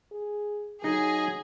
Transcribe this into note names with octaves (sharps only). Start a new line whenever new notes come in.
G#4
F#3 D#4 G#4 D#5